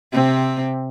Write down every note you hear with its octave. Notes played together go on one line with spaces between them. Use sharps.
C3 C4